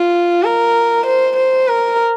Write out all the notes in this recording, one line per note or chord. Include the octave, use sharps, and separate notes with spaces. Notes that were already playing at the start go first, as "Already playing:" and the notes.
Already playing: F4
A#4
C5
C5
A#4